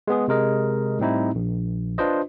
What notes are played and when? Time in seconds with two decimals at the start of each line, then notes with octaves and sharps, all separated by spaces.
0.08 G#3 B3 G#4
0.28 C3 G#3 A#4 D#5
0.99 A2 G3 C4 D#4 E4
1.35 A#1
1.98 D4 F4 B4 C5 D#5